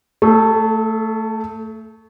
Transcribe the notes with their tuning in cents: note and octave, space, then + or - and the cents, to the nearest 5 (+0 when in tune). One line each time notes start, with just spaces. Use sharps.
A3 +15 A4 -40